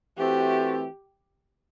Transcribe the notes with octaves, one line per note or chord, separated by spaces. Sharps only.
E3 A3 C4 F#4 G4